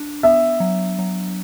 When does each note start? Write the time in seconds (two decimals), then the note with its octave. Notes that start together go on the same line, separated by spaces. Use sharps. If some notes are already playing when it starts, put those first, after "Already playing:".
Already playing: D4
0.23 B3 E5
0.60 F#3
0.99 F#3